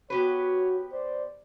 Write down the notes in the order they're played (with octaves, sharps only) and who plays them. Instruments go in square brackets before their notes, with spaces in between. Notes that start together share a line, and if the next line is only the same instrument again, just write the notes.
[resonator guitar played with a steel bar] B3 G4 B4 [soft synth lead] F#4 [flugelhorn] C#5
[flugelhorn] C5 [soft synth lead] D5